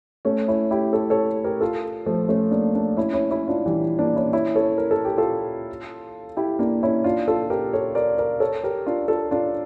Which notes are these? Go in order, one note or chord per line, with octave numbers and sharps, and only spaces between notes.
A3 C#4
C#4 E4
E4 G4
A4 C#5
A4 C#5
G4 A#4
F4 A4
F3 A3
A3 C#4
A#3 D4
A#3 D4
C#4 E4
C#4 E4
C#4 E4
D4 F4
E3 G3
A#3 D4
C#4 E4
C#4 E4
A4 C#5
A#4
A4
G4
F4 A4
E4 G4
A#3 D4
C#4 E4
D4 F4
F4 A4
G4 A#4
A4 C#5
A#4 D5
A#4 D5
A4 C#5
G4 A#4
D4 F4
F4 A4
D4 F4